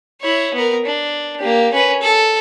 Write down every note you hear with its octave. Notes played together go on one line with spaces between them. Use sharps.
E4 C#5
B3 A#4
D4
A#3 G4
C#4 B4
A4